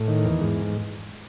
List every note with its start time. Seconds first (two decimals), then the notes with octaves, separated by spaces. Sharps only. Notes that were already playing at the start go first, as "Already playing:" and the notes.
Already playing: A2
0.08 D#3
0.25 E2
0.41 G#2